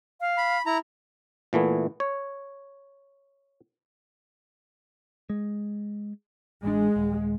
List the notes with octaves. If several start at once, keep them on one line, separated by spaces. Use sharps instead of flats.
F5
B5
E4 A#5
A#2 E3 A3 B3
C#5
G#3
A1 G#3 D4
D#1